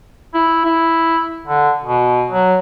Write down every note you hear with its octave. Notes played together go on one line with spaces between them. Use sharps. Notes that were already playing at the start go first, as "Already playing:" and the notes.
E4
E4
D3
B2
F#3